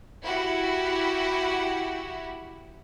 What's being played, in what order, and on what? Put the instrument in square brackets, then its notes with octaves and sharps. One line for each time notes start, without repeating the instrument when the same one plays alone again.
[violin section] E4 F#4 G4